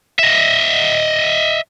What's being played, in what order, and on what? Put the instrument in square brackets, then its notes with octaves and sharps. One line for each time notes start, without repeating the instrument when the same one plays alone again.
[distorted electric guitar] D#5 E5